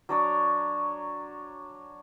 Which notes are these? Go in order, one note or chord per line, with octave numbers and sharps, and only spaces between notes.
F#3 D4 C#5